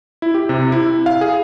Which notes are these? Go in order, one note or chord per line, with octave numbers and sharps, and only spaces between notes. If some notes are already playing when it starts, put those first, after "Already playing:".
E4
G4
C3
E4
F5
G#4